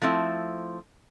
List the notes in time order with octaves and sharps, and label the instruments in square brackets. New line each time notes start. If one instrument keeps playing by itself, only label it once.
[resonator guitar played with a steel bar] F3 A3 C4 E4